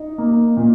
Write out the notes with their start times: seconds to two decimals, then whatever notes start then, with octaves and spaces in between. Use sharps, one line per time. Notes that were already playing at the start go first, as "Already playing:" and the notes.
Already playing: D#4
0.18 A#3
0.57 A#2